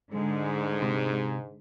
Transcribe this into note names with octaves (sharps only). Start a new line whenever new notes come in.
G#2 D3 G#3
C3